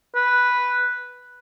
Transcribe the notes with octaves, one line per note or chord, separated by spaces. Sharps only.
B4